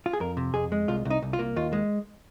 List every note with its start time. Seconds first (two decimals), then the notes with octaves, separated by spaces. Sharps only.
0.06 F4
0.13 G#4
0.20 F2 A#4
0.37 C3
0.54 F2 G#4
0.72 G#3
0.88 C2 F4
1.05 C2
1.10 D#4
1.22 C2
1.33 F4
1.39 A#3
1.56 D#2 F4
1.73 G#3